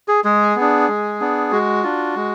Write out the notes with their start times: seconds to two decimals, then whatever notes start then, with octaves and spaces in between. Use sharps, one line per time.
0.08 G#4
0.24 G#3 G#4
0.56 B3 D4
0.88 G#3
1.20 B3 D4
1.51 G#3 F#4
1.83 D4 F4
2.16 G#3